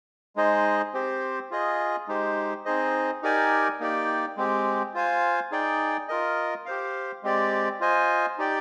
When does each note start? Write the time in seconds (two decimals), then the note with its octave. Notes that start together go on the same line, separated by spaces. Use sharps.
0.36 G#3 D#4 G#4 C5 D#5
0.93 C4 G4 C5
1.51 F4 G#4 D#5
2.08 G#3 D#4 G4 C5
2.65 C4 D#4 G#4 C5 D#5
3.22 D#4 G4 A#4 D5 G#5
3.80 A#3 D#4 G4 D5 G5
4.37 G#3 C4 G4
4.94 F4 C5 F5 G#5
5.51 D#4 G#4 D5 G5
6.08 F4 A#4 D#5
6.66 G4 C5 F5
7.23 G#3 C4 G4 D5
7.80 F4 C5 D#5 G#5
8.38 D#4 G4 D5 G5